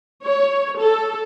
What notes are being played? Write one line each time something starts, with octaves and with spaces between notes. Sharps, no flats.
C#5
A4